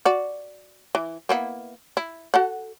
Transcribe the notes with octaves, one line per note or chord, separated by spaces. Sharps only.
F#4 D5
E3
A#3 B3 E4
E4
F#4 A4 F#5